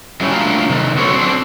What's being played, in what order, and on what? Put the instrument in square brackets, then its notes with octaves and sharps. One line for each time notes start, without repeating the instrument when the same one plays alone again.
[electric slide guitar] E3 F#3 G3 A3 C#4
A3 D4 F4 F5 A#5
C3 D#3
F#3 B3 A4 C5 C#5
C4 D4